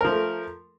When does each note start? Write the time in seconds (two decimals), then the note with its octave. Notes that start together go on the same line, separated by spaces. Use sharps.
0.01 A#4
0.04 F3
0.08 A3